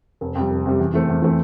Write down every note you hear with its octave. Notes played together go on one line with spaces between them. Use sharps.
F1
F2 C3 G3
F1
F2 C3 G3
E2
E3 A3 C4
E2
E3 A3 C4